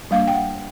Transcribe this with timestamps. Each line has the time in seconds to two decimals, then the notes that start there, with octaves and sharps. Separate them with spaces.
0.11 G3 A#3 D4 F5
0.27 G5
0.34 F#5